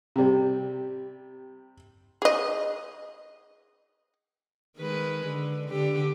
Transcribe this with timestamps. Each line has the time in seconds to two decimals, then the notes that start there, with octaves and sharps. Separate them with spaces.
0.16 C3 G3
2.22 G#4 D#5
4.78 D#3 G#3 B4
5.26 D3
5.69 D3 G4